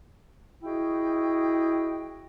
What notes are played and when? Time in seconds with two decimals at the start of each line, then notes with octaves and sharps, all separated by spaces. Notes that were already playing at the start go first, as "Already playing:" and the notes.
0.63 E4 F#4 G#4 D#5 G5